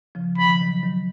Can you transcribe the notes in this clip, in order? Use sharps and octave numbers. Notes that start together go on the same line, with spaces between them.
C#3 F3
F3 B5
D#3
C#3 F3
D#3 F#3
D#3 F#3